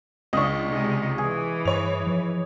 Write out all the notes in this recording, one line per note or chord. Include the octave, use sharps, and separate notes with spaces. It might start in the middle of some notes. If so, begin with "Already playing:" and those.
C#2 D4 D#5 C#6
C3 G#3 D#4
E3 G#4
G2 C#5 F7
F3